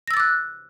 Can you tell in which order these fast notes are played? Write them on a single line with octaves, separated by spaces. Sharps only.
A#6 E6 A6 D6 F#6